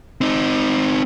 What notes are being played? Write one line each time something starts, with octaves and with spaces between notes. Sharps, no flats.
C4 D#4